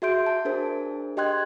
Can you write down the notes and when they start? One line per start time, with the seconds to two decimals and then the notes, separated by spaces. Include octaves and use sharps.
0.02 F#4 G#4 E5 C6 G6 D7
0.26 A5
0.45 D4 G#4 A#4 C5
1.17 G4 D#5 G5 C6 F#6 G#6